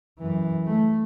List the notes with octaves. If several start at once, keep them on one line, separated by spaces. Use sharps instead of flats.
F#2 E3
A3